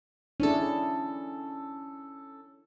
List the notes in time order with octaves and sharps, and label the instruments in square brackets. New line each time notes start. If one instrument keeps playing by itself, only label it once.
[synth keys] C#4 A4 [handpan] D4 E4 G#4